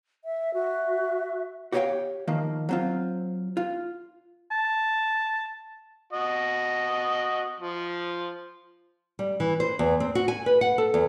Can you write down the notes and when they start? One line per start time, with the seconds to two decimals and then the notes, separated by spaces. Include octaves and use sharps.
0.25 E5
0.54 F#4 E5
1.72 F#4 G4 C#5 D5 F5 G5
2.28 D#3 F3 A#3
2.69 F#3 C4 F4
3.57 F4
4.52 A5
6.13 F#4 D#5
7.60 F3
9.19 G3
9.40 E3
9.60 C5
9.79 E2
10.00 C4
10.15 F#4
10.28 G#5
10.46 B4
10.61 F#5
10.78 A4
10.94 E2